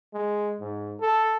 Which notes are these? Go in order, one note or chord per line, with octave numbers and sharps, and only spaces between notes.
G#3
G#2
A4